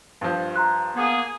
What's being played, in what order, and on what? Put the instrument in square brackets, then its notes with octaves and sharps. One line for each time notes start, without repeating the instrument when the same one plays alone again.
[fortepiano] G2 F3
[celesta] A#5 C6 F#6
[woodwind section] A#3 B3 G#4